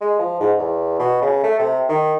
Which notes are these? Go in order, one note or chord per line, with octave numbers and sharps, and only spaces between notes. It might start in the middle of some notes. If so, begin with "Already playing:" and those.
G#3
F3
G#2
E2
B2
C#3
A3
C3
D#3